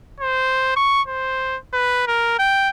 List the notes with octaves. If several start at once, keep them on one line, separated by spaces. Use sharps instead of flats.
C5
C#6
C5
B4
A#4
G5